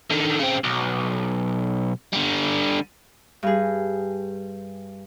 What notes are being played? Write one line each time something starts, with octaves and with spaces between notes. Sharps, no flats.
D3 D#3
C#3 C4
B1
D3 G3
G2 G#4